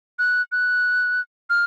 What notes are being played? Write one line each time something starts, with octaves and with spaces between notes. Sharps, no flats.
F#6
F#6
F6